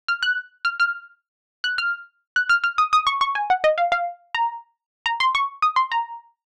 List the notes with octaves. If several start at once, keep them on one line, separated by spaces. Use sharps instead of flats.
F6
F#6
F6
F6
F#6
F6
F#6
F6
F6
D#6
D#6
C#6
C#6
G#5
F#5
D#5
F5
F5
A#5
A#5
C6
C#6
D#6
C6
A#5